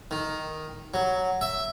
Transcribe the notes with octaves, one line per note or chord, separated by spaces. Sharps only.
D#3
F#3
E5